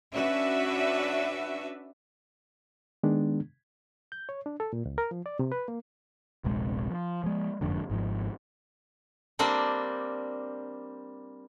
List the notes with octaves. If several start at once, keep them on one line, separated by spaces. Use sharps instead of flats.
C#4 D4 F#4 B4 E5
D#3 G#3 B3 D4
G6
C#5
D4
A4
A#2
C#2
A#4
F3
D5
C3
B4
A#3
D#1 A#1 C3 G#3
F3
F3 G#3
F#1 F2 G#2 D3
G#1 G#2 F3
G3 A#3 C4 D4